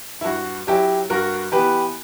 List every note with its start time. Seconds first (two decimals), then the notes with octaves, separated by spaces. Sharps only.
0.21 E4
0.24 G2 F#4
0.67 F#3 C#4 E4 G4
1.10 G2 F#4 A#4
1.52 E3 B3 G4 B4